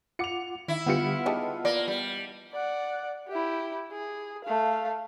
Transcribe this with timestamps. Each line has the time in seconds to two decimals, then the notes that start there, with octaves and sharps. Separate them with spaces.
0.19 F4 F#5 D6 C#7 F7
0.68 D#3 E4
0.86 D3 G3 B3 F4 G4 C#7
1.26 D#4 G4 G#4 D#5 A5
1.65 A#3 D5
1.88 G3
2.52 D5 F#5
3.28 E4 G4
3.92 G#4
4.44 A3 F5